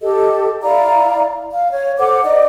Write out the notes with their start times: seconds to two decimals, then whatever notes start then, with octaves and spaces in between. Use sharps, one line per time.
0.01 G4 A4 D#5
0.62 E4 D5 F5 A#5
1.51 F5
1.72 C#5
1.98 A4 C5 F#5 D6
2.23 D#4 D5 D#5